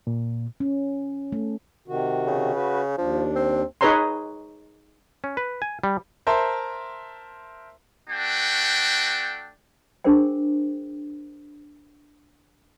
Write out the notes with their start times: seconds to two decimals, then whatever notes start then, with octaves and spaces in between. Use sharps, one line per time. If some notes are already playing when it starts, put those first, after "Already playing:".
0.07 A#2
0.60 C#4
1.32 A3
1.88 C3 D#3 F#4
2.27 C#3
2.55 F#4 B4
2.98 D#2 F3 D4
3.35 C4
3.81 D#4 G#4 B4 C#5 A#5 C6
5.24 C#4
5.37 B4
5.62 G#5
5.84 G3
6.27 A#4 C5 E5 A5 C6
8.10 A3 D4 F#4 G5
10.04 D4 G#4 A#4 C5 G5